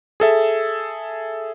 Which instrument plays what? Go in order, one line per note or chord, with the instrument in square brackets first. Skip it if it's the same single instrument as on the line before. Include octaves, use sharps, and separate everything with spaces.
[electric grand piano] G#4 A4 E5